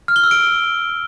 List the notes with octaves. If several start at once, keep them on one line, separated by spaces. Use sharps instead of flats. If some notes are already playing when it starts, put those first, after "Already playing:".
F6
G7
E6
D7